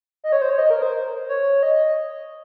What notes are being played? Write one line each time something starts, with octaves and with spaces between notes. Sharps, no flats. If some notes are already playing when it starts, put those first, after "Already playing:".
D#5
C#5
C5
C#5
D#5
A#4
C5
C#5
D#5